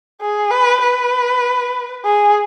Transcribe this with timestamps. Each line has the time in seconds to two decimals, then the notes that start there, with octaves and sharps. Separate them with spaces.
0.21 G#4
0.51 B4
0.82 B4
2.05 G#4